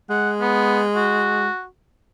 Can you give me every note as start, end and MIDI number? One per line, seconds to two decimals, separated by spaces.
0.10 1.48 56
0.10 0.30 78
0.41 0.82 59
0.95 1.66 66